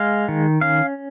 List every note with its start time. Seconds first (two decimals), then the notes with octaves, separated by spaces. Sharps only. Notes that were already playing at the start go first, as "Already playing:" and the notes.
Already playing: G#3 F5
0.28 D#3
0.61 C#4 F5